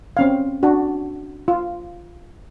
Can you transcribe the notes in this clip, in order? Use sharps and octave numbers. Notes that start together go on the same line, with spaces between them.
C4 C#4 F5
D4 F#4
F4